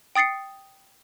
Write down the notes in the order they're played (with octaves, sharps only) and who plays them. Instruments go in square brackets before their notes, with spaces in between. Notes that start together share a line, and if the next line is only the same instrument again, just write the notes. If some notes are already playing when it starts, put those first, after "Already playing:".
[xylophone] G5 D#6 A6 C7 C#7